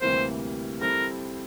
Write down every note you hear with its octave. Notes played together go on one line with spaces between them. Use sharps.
D2 C3 E3 G3 A#3 C5
G3 C4 E4 A4 A#4